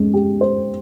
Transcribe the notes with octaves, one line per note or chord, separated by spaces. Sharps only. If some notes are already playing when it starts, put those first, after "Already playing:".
Already playing: G#3 C#4
G4
C5